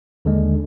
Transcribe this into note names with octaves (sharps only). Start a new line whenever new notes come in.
D#2 D3 G#3